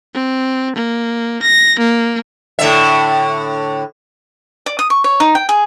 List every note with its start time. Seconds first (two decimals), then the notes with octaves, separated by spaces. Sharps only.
0.14 C4
0.75 A#3
1.42 A#6
1.79 A#3
2.59 A2 D3 E5
4.66 D5
4.79 D#6
4.90 C#6
5.04 C#5
5.20 D#4
5.35 G5
5.49 G#4